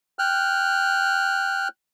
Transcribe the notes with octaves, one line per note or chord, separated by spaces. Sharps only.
G5 F6 F#6